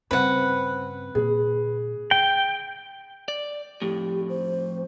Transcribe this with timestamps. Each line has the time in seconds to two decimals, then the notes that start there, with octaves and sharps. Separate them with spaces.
0.11 G2 C#3 C4 B4 F#5
1.15 A#2 D3 G#4
2.11 D3 G5
3.28 D5
3.82 F2 A2 G4
4.29 C5